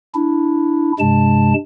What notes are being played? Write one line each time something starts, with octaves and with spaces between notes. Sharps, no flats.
D4 E4
G2 C3 G#3 A5